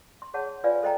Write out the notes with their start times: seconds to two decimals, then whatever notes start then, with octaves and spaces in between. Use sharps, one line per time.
0.22 C6
0.34 G#4 C#5 F#5 A5
0.64 F4 B4 D5 F5 G#5
0.83 A4 C5 D#5 G5 A#5